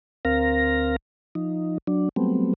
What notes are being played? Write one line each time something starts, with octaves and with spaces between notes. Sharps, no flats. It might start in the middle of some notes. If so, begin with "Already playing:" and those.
D2 C4 A#4 F5 A#6
F3 D#4
F#3 D4
F#3 G3 A3 B3 C4